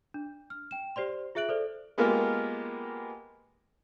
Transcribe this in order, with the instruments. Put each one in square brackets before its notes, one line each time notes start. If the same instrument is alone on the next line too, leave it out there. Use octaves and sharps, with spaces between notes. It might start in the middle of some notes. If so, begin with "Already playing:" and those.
[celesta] D4
F6
G5 E7
G4 C5 D5 C6
F4 G#4 E5 F#6 D7 F#7
A4 C5 D5
[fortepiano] G#3 A#3 B3 F4 G4 A#4